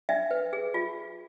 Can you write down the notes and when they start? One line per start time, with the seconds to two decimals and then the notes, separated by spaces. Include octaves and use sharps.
0.09 D4 E5
0.31 B4
0.53 G#4
0.74 F4